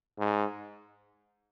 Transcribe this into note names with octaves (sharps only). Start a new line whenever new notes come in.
G#2